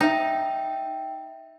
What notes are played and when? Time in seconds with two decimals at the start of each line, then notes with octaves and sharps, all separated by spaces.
0.01 D#4 E5 G5